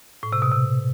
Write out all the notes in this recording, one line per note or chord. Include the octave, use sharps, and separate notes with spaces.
A2
C3
B2
C3